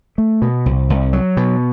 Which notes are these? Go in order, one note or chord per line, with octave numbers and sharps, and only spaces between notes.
A3
B2
C2
C2
F#3
B2